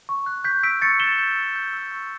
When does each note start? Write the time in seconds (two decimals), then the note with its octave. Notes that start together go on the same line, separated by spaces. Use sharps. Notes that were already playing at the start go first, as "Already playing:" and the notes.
0.09 C#6
0.26 F#6
0.44 G6 B6
0.63 E6 B6 D7
0.82 C#6 A6 C#7
1.00 C#6 E7 G7
1.18 G6
1.37 E6
1.56 G6
1.73 E6
1.92 C#6